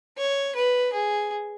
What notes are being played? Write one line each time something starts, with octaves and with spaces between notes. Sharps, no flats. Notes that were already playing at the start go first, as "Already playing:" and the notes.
C#5
B4
G#4